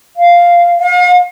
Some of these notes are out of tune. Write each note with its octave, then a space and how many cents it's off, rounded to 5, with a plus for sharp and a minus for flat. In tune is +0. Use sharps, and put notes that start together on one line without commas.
F5 -5
F5 +45